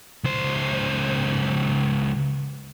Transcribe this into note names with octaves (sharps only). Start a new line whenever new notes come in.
C#2 C5